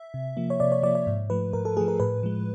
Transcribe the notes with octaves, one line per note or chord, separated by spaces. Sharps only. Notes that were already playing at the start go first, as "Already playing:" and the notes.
Already playing: E5
C3
F3 A#3
C#5
C3 D5
C#5
F3 A#3 D5
D5
G#2
F3 A3 B4
G#2 A#4
A4
F3 A3 G#4
A#4
A2 B4
F3 G#3